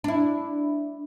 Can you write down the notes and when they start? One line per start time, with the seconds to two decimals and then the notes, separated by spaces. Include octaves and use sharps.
0.04 D4 E4